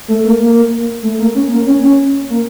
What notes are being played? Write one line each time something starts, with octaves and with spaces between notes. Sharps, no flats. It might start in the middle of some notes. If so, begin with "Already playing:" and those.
A3
A#3
A#3
A3
A#3
C#4
A#3
C#4
C#4
A#3